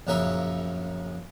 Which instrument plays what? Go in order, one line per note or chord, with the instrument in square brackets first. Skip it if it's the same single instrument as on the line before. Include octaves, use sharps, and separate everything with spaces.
[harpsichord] A#1 F#2 C#3 C#4 A#4 E5